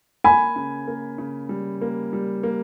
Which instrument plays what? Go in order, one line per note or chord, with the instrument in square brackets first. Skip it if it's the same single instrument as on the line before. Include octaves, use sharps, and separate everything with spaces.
[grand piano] A#3 [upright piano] G#5 B5
[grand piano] C#3
A#3
C#3
G3
A#3
G3
A#3